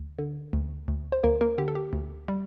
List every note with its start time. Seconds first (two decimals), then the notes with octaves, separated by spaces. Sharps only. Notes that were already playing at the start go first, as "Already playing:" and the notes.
Already playing: D2
0.19 D3
0.53 D2
0.88 D2
1.12 C5
1.23 D2 A#3 A#4
1.41 A#3 A#4
1.58 D3 G4
1.68 A4
1.75 G4
1.93 D2
2.28 G3